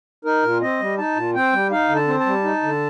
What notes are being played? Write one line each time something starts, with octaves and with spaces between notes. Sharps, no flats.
D#4 A#4
A#2
C4 D#5
G3
D#4 A5
A#2
C4 G5
G3
D#4 F5
D3
A5
C4
A5
G3
D#4
D3